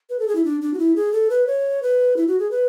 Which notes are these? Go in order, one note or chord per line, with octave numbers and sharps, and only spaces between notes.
B4
A4
G#4
E4
D4
D4
F#4
E4
G#4
A4
B4
C#5
B4
E4
F#4
G#4
B4